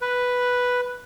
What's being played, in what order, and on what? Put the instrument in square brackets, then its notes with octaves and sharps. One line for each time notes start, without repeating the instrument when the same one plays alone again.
[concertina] B4